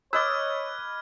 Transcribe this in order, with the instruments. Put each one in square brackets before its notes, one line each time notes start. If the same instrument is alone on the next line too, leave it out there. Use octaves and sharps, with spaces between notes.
[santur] B4 D#5 D6 [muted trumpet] C#5 [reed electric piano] E6 A6 [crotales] F6 G#6